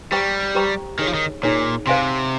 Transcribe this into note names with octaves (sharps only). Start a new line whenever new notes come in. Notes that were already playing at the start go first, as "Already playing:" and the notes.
G3 G4 C5 G5 A#5 C#6
G4 C5 G5 A#5 C#6
D#3 D#4 G#4 C#5
F3
D#3
A#2 D#4 G#4 C#5
C3 C5 F5 G#5 C6